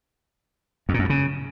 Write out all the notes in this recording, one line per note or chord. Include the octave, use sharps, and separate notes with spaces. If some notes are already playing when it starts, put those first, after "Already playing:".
F2
A#2
F#2
G2
C#3